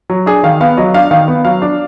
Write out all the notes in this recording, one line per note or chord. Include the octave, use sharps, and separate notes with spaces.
F#3
D4 G#4
D#3 F5
B3 F5
F#3 D#5
D4 F5
D#3 F5
B3
F#3 F5
D4